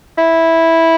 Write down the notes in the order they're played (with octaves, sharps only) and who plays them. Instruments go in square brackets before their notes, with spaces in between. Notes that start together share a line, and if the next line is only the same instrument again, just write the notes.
[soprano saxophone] E4